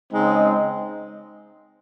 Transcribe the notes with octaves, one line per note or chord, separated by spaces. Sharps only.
C#3 G#3 C4 D#4